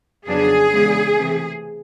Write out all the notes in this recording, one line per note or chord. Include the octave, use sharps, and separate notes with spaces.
F2 C#3 F#3 B3 D4 G#4
C#3 E3 G#3 B3 D4
C3 E3 A3